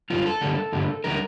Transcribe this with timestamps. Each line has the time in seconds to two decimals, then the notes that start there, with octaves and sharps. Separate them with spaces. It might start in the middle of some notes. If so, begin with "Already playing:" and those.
0.10 G2 D3 G3 F4
0.26 A4
0.41 G2 D3 G3 A#3
0.72 G2 D3 G3 A#3
1.04 D3 G3 A#4